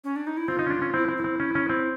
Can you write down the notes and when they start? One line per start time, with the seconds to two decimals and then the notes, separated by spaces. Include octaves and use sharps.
0.04 C#4
0.16 D4
0.27 D#4
0.37 E4
0.48 C4 F4
0.59 D#4
0.66 C#4
0.70 D4
0.82 C#4
0.94 C4 E4
1.09 C4
1.17 E4
1.24 C4
1.40 C#4
1.55 C#4
1.69 C4